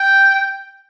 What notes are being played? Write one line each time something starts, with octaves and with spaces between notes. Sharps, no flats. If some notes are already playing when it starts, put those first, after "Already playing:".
Already playing: G5